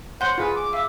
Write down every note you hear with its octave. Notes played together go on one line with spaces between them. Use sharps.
C5 C#5 F#5 C6 G6
F4 G#4 B4
D6
E5 F5 D6